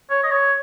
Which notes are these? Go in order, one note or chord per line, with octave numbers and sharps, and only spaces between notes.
C#5
D#5
C#5